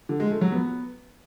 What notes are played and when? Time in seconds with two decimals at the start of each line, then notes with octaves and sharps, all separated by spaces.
0.09 D3
0.20 G#3
0.31 A3
0.41 F#3
0.52 B3